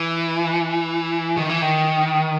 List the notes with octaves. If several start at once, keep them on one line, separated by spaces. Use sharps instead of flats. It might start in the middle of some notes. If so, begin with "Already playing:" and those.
Already playing: E3
D#3
E3
D#3